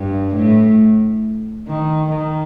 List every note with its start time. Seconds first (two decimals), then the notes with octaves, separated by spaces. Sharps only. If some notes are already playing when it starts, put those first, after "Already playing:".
Already playing: G2
0.35 A2
1.67 D#3
2.11 D#3